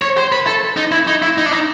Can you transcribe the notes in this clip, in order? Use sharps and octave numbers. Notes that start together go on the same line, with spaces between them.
C#5
C5
B4
A4
D#4
E4
D#4
E4
D#4
D4
D#4